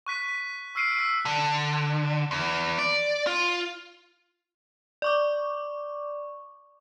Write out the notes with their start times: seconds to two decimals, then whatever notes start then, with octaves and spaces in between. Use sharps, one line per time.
0.06 C#6 F#6 B6 D#7
0.75 C#6 E6 F6 C7 D7 D#7
0.99 E6 B6
1.25 D3
2.31 E2
2.78 D5
3.27 F4
5.02 D5 C#6 D6